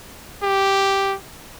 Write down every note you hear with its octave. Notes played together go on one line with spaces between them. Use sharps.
G4